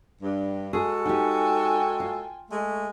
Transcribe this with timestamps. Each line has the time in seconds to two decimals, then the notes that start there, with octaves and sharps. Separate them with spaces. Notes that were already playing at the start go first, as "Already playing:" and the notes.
0.22 G2
0.73 G#3 F#4 G#4 A4
1.06 D#4 G4 G5 G#5
2.00 F4
2.50 G#3 A3